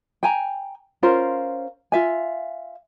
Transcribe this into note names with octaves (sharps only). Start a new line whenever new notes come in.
G5 G#5 A#5
C#4 F4 A#4 C5
F4 E5 G#5